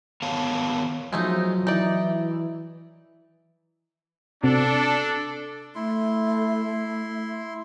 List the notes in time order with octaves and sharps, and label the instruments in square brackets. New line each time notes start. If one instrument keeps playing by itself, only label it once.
[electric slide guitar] D#3 B3 A#4 C#5 F5 A5
[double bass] F3 [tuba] F#3 [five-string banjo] G#3 A3 D#4
[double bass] E3 [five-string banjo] D#4 D5 [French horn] E4
[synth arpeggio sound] C3 C4 F#4 [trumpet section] D4 A4
[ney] A3 [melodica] E4 C6